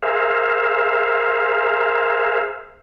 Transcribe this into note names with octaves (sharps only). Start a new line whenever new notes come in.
G#4 A#4 C5 E5 F5